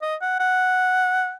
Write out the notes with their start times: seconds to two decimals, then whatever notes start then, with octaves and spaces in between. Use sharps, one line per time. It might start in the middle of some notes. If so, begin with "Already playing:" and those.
0.02 D#5
0.21 F#5
0.40 F#5